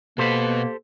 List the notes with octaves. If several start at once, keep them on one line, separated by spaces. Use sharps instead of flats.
B2 A#3 G4 A4 B4 C5